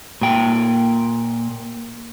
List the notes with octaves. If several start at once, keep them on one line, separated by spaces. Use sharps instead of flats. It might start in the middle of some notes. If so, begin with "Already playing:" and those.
A#2 G5